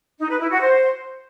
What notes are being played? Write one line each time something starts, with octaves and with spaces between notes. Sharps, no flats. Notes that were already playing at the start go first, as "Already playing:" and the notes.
D#4
B4
E4
F#4
C5